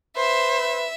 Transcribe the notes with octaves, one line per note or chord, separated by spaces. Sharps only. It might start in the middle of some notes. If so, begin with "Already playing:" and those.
B4 C5 E5